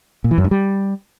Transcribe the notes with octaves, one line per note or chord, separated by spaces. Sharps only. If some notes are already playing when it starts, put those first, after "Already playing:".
A#2
E3
F#2
G2
G3